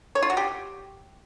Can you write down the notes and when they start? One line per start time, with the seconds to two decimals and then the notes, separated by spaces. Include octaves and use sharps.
0.15 C#5
0.22 F4
0.30 F#4
0.37 G4